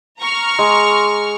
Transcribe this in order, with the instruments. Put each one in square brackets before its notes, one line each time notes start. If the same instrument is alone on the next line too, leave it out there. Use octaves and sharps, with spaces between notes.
[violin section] A#5 C#6 F6
[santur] G#3